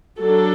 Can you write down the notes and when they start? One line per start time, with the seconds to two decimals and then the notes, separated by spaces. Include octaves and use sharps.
0.19 F#3 D4 A4